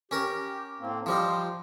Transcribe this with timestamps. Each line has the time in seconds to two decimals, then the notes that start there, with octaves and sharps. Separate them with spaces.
0.11 C#4 G4 A#4
0.80 A2 A#3 C4
1.06 F3 G3 D#4 F4 C5